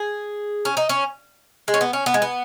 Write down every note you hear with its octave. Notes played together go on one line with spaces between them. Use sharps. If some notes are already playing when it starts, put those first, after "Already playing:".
Already playing: G#4
C#4
D#4
C#4
G#3
C#4
B3
C#4
B3
G#3
B3